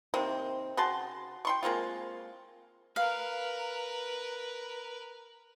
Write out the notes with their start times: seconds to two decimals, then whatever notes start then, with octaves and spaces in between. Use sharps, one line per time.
0.14 C3 D#3 A#3 C4
0.77 C#3 F#4 A5 C6
1.45 G5 C6 C#6
1.63 G#3 A#3 C4 F4
2.96 A#4 B4 F5